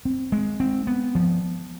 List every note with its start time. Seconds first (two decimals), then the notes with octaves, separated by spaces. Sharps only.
0.05 C4
0.32 G#3
0.60 C4
0.87 B3
1.15 F3